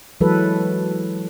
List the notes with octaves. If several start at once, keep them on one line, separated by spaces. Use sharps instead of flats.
E3 F#3 G#3 A4 B4